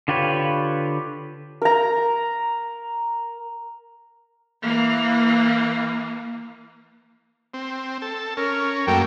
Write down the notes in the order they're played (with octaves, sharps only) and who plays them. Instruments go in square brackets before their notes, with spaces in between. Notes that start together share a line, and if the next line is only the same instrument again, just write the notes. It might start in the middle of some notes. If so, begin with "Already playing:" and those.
[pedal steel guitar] D3 F4 G4 B4 C#5
[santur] A#4 A#5
[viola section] E3 A#3
[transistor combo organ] C4
A4
[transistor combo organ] C#4 [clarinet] A#4
[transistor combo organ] F#2 A3 A#3 [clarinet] G5